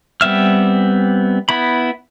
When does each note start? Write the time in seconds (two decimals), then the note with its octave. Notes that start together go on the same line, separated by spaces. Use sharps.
0.21 G3 B3 C4 E5 F6
1.49 B3 E4 B5